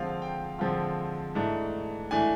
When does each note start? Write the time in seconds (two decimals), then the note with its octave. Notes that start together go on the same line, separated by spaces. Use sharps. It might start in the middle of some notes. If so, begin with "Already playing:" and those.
Already playing: D3 F3 G#3 C4 F4 F5
0.22 G5
0.59 D3 F3 G#3 C4 F4
1.35 G#2 E3 A3 D4
2.11 E3 A3 D4 G#5